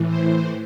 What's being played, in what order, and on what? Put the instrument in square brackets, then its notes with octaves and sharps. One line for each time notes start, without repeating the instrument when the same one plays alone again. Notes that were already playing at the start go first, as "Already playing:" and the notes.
Already playing: [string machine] A2 E3
C5